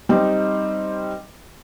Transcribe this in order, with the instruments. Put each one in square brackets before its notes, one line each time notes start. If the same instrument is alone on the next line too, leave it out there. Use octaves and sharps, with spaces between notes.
[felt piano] G3 C4 D#4